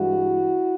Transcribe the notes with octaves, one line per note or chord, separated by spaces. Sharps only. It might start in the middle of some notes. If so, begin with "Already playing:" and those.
Already playing: G2 E3 G#3 E4 F#4